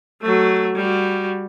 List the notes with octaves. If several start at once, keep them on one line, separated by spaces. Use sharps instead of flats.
F#3 A3
G3 F#4